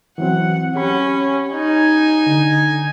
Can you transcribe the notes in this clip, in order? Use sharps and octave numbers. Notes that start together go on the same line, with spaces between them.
E3 F#3 C4 F#5
C#4 G4 B5
D#4 G#5
D3